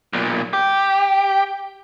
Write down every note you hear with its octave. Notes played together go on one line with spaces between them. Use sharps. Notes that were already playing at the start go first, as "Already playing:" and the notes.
B1 A#2
G4